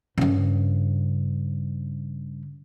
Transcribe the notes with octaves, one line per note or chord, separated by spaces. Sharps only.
G2 C#3